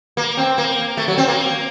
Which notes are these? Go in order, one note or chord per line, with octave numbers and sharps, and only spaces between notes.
A#3
C4
A#3
A3
F#3
C4
A#3